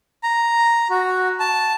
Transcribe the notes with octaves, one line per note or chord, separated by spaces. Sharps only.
A#5
F#4
A5